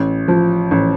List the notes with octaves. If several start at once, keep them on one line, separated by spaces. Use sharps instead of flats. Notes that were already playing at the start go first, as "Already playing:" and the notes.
Already playing: A1
F3
A1